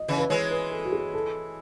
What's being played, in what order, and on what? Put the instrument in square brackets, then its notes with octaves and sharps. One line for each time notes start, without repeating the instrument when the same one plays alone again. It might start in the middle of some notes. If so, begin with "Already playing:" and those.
Already playing: [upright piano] D#5
[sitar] C#3 E3
[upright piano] B4
[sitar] E3 G#3 [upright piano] C#5
[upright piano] B4
A4
F#4
G#4
A4